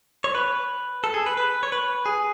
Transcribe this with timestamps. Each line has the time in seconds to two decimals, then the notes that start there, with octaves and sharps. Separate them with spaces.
0.24 C#5
0.35 B4
1.04 A4
1.14 G#4
1.26 B4
1.37 B4
1.63 C#5
1.72 B4
2.06 G#4